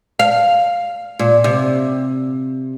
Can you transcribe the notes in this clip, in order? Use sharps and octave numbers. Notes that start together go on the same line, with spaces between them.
F5
A#2
C3